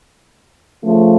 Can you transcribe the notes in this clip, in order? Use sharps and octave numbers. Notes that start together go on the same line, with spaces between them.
C#3 F3 A3